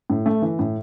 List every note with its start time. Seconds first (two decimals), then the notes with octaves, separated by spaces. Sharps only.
0.10 A2
0.26 A3
0.42 E3
0.59 A2